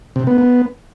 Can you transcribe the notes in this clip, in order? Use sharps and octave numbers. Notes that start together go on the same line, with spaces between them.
C3
B3
B3